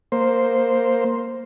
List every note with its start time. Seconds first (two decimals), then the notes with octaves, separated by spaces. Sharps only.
0.12 A#3 C5